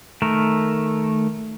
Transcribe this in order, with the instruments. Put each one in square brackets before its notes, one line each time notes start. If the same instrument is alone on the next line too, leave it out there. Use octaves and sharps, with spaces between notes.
[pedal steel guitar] D#3 A3 A#4